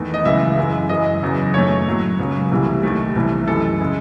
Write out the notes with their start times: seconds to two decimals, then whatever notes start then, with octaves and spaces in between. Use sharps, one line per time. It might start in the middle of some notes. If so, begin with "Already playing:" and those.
Already playing: E2 D#3 A3
0.14 D#5
0.25 C#2 C#3 E3 G#3 E5
0.58 F#2 E3 G#3
0.89 F#2 E3 G#3 D#5
1.22 E2 C#3 F#3
1.54 F#2 D#3 A3 C#5
1.87 A2 F#3 A3
2.19 C#2 C#3 F#3
2.51 C2 C3 E3 A3
2.83 D#2 D#3 A3
3.15 C2 C3 E3 A3
3.48 F#2 E3 G#3 A4
3.81 C#3 G#3